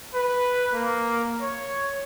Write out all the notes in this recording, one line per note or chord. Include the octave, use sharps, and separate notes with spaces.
B4
A#3
C#5